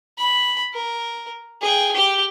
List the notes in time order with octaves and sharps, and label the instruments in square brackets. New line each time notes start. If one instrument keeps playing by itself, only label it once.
[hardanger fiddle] B5
A#4
G#4 G5
G4 G5